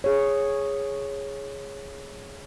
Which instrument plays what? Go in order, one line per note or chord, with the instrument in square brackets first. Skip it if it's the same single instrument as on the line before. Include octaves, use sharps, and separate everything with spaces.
[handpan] G#4 C#5